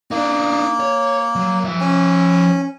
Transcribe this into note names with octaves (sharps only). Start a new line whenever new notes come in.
A#3 D4 D#4
C#5
F#3
F3 E5
C#4